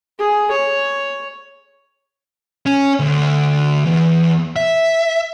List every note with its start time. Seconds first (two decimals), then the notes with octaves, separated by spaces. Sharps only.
0.18 G#4
0.51 C#5
2.66 C#4
3.00 D2
3.85 E2
4.56 E5